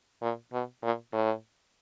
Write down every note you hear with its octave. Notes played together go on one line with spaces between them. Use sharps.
A#2
B2
A#2
A2